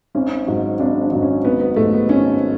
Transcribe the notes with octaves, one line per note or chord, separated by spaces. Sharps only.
G#1 C#4
G#2 F#3
G#1 D4
D4
G#2 F#3
C#4
G#1 B3
B3
G#2 F#3 A3
B3
G#1 C#4